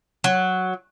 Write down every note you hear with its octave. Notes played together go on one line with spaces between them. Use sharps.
F#3